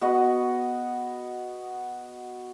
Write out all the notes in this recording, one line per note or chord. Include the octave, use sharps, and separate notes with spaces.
B3 F#4 D#5 F#5